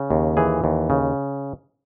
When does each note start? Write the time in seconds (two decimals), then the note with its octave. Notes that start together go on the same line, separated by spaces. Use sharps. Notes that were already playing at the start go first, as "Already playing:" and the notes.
Already playing: C#3
0.11 D#2
0.37 E3 G#4
0.64 D#2
0.90 C#3